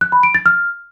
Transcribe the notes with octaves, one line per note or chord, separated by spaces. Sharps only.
F#6
B5
D7
A6
F6